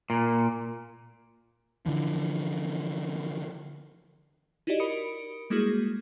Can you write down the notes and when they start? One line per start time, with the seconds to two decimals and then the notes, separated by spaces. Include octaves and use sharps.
0.10 A#2
1.86 D3 E3 F3
4.67 D#4 E4 F#4 G4 D5 D#5
4.79 A#4 B5 D#6 C#7 D7
5.50 G3 G#3 A#3 E4 F#4 G#4